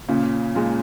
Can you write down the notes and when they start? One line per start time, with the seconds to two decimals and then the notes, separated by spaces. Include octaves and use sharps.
0.08 A#2 C#3
0.55 A#2 G#3